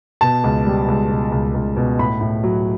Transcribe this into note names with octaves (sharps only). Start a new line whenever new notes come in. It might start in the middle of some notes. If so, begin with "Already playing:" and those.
B2 A5
C#2
G3
C#2
B2
C#2
C#2
B2
A2 B5
A2
F#3